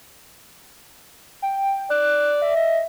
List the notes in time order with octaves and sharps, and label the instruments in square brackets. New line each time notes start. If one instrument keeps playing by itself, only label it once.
[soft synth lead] G5
[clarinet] D5 [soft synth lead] F#6
[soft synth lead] E5
[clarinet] D#5